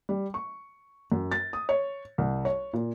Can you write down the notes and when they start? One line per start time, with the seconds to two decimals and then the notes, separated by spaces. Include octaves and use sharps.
0.09 G3
0.34 C#6
1.12 F#2
1.32 A6
1.53 D#6
1.69 C#5
2.18 C2
2.45 C#5
2.73 A#2